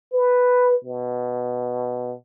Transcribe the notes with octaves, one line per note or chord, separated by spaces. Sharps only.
B4
B2